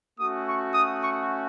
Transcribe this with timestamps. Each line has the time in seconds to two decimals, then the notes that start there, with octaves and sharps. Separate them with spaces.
0.18 A3 C#4 F#4 D#6
0.47 C#6
0.74 D#6
1.03 C#6